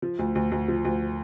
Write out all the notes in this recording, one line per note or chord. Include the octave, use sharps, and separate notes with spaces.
F3
D2
D2
D2
F3
D2